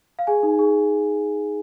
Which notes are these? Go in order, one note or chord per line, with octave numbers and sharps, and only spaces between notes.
F5
G#4 G#5
D#4
G#4